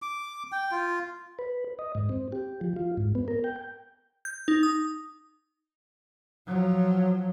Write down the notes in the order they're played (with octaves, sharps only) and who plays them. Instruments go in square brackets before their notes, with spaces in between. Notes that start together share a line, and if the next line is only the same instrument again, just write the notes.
[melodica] D6
G5
F4
[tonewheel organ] B4
D#5
G#2
C4
G4
F3
F4
G#2
B3
A#4
G5
[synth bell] G6
D#4
D#6
[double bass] F3 F#3